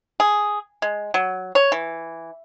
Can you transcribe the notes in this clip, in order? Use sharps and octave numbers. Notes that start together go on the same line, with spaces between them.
G#4
G#3
F#3
C#5
E3